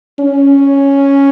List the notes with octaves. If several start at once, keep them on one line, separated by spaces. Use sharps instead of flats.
C#4